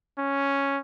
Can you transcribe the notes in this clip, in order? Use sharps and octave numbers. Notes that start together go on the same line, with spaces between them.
C#4